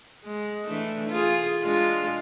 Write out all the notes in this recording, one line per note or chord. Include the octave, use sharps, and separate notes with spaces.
G#3
E3 A3 D4
F4 G#4
G#3 D4 F4